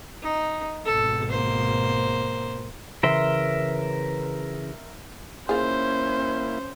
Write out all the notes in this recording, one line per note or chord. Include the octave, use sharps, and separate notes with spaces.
D#4
G#1 B2 A4
A#3 C5
C#3 E3 A#4 E5 C6
A#3 C#4 E4 F4 G#4 C5